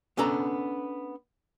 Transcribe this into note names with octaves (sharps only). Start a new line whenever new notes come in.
B3 C#4 D4 A4 A#5